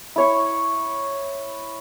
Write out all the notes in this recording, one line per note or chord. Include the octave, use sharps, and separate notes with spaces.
E4 C#5 C#6